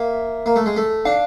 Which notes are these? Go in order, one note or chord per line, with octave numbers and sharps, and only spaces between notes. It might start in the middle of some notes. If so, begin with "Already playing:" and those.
Already playing: A#3 E5
A#3
A3
G#3
A3
D4 F5